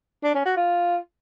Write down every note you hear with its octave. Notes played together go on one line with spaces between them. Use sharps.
D4
C#4
F#4
F4